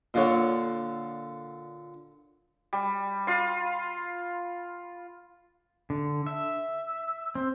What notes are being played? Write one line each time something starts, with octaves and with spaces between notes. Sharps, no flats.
A#2 D3 C#5
G3
F4 C6
D3
E5
C4